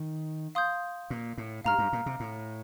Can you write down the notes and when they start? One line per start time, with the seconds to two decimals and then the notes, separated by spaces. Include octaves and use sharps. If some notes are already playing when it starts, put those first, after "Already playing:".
Already playing: D#3
0.55 F5 C6 D#6 G6
1.10 A#2
1.38 A2
1.65 G2 F5 A#5 F6
1.78 G2
1.93 A#2
2.06 C3
2.20 A2